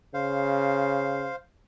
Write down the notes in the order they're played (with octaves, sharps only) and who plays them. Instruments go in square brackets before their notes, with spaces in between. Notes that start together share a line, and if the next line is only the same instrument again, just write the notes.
[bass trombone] C#3 [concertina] C5 F5